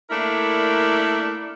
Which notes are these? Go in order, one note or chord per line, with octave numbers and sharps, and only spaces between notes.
A3 A#3 D4 E4 A#4